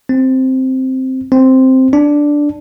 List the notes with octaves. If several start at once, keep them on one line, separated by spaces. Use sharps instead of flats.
C4
C4
D4